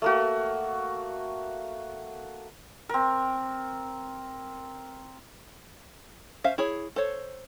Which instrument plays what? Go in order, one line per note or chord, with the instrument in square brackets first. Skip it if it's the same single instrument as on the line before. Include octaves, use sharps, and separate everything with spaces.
[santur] A3 A#3 F#4
C4 A#4
[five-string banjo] C#4 C5 E5 F5
E4 G#4 C#5
A4 C5 C#5